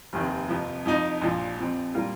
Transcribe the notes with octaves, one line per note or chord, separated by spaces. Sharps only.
F1 D#2 D#3 C4
F2 C3 F3
F2 F3 D#4
A#1 A#2 F3
F2 F3 C4
A#2 G3 A#3 F4 A#4